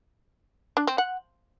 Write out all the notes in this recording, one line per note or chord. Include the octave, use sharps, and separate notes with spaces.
D4
C4
F#5